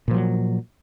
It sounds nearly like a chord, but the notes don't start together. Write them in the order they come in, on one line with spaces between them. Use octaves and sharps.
A#2 F3 F#3